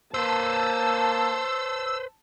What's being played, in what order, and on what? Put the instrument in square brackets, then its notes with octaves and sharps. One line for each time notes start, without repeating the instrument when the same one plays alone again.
[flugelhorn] A#3 [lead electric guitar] B4 C5 [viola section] A5 [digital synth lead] E6